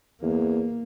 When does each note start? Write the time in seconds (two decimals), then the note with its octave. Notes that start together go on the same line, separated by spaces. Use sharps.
0.22 E2 A#3